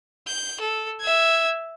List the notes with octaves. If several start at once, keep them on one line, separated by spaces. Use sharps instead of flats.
G6
A4
E5 G#6